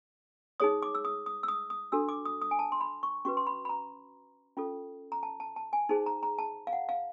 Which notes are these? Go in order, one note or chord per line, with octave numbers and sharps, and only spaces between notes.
D#4 G#4 C#5 D#6
D6
E6
D#6
D#6
E6
D#6
D#6
D4 F#4 A4 E6
D6
D#6
D#6
G#5
A5
C6
B5
C#6
C#4 F#4 B4 C#6
C6
B5
B5
A#5
C#4 F4 A4
A#5
A5
A5
A5
G#5
D#4 G#4 C5 A5
A#5
A#5
A5
F5
F#5
F5